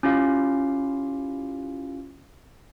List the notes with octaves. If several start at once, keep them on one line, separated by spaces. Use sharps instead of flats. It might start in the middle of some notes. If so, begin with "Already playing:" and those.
C#4 E4 F4 G4 F5